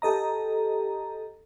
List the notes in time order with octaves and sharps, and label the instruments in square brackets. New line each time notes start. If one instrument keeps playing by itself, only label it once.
[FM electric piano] G4 A4 D#5 A#5